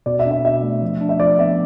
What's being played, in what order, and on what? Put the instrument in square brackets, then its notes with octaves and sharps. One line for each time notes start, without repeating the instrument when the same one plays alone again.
[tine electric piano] B2 [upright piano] D5
[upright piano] E5
[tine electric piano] D4
[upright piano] E5
[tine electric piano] B2 [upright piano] E5
[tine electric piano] A3
F3
D4
[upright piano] E5
[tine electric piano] F3 [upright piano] D5
[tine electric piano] B3 [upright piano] E5